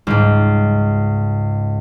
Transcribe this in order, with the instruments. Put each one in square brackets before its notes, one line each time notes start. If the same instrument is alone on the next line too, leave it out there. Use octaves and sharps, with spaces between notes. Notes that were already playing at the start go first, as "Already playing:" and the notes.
[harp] C#2 G#2